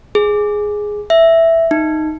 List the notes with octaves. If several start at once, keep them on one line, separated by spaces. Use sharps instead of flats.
G#4
E5
D#4